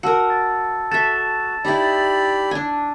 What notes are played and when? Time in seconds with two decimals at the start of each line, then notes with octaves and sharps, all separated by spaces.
0.03 F#4 A#4 A5 E6 C#7
0.30 A6
0.92 F#4 A4 E5 A6 E7
1.65 D#4 E4 G4 D5 B5
2.51 D4 G#5